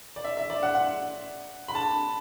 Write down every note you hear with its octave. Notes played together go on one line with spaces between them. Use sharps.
D5
E5
E5
D5
F#5
F#5
B5
A5